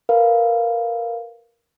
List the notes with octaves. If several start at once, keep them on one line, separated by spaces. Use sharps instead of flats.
A#4 B4 F5